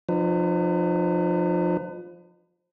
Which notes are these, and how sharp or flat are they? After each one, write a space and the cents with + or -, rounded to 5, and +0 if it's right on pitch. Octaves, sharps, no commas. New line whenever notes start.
F3 +15 D#4 -40 B4 +30